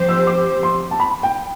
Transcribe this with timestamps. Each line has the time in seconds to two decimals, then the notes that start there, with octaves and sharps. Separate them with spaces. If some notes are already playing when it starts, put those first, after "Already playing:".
Already playing: F3 C4 G4 C5
0.09 E6
0.27 D6
0.63 C6
0.91 A5
1.00 B5
1.23 G5